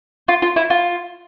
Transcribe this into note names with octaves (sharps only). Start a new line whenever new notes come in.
F4
F4
E4
F4